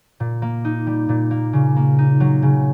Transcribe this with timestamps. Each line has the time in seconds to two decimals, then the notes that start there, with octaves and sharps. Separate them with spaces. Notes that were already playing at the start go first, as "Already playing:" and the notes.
0.20 A#2
0.42 A#3
0.65 D#4
0.87 G3
1.09 A#2
1.31 A#3
1.53 C#3
1.76 A#3
1.98 D#4
2.20 F#3
2.42 C#3